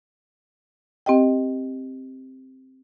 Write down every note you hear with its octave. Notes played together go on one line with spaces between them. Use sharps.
C4 G4 D#5 G5